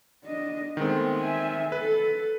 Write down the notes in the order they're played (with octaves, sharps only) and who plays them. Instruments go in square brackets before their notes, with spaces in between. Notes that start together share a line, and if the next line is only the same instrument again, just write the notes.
[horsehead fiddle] D4 D#5
[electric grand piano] D#3 G#3 C4 [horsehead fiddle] A3 B3
[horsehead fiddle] E5 G#5
[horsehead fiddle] A4 [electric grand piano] B4